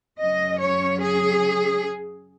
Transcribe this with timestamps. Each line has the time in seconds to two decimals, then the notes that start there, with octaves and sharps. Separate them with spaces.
0.19 F#2 C#3 F#3 C#4 D#5
0.59 C#5
1.00 G#4